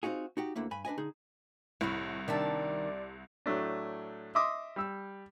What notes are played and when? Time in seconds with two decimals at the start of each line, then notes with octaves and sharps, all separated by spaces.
0.03 C4 D#4 F4 F#4 G#4
0.37 D#4 F#4 G4
0.55 D2 D3 A#3 E4
0.71 G2 G#5 B5
0.85 D4 B4 D#5 G#5
0.98 D3 D#4 G#4
1.81 C2 A2 D#3 E4 F#4
2.28 C3 D#3 D4 D5 E5 A5
3.46 A2 F#3 A3 D4
4.35 D#5 E5 C6 D6 D#6
4.76 G3 E6